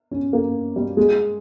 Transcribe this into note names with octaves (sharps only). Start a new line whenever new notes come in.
C#4
A#3
G3
G#3